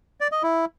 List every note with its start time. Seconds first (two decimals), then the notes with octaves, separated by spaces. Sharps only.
0.21 D5
0.32 D#5
0.43 E4